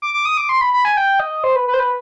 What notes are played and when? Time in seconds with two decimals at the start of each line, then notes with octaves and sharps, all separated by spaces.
0.02 D6
0.14 D6
0.25 D#6
0.37 D6
0.49 C6
0.61 B5
0.73 B5
0.85 G#5
0.97 G5
1.20 D#5
1.44 C5
1.56 B4
1.68 B4
1.74 C5
1.79 B4